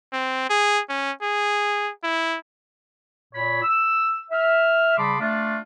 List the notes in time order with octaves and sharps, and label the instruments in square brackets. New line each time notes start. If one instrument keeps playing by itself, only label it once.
[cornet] C4
G#4
C#4
G#4
E4
[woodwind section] A#2 C#5 B5
E6
E5 F6
C#3 G3 A5 B5 C6 D6
A3 D4 F4